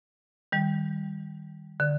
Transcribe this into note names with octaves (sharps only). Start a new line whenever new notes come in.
D#3 G3
D3